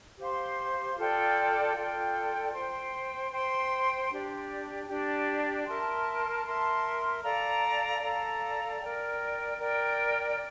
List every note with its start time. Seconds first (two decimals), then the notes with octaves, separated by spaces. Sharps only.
0.19 G4 C5 F5 C6
0.97 F4 A4 D5 G5
1.75 F4 A4 D5 G5
2.53 C5 G5 C6
3.31 C5 G5 C6
4.10 D4 G4 D5
4.88 D4 G4 D5
5.66 A#4 E5 A5 C6
6.45 A#4 E5 A5 C6
7.23 A4 D5 F5 A#5
8.01 A4 D5 F5 A#5
8.79 A#4 D5 G5
9.58 A#4 D5 G5
10.35 D5